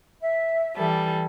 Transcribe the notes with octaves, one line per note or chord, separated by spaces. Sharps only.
E5
E3 G3 A4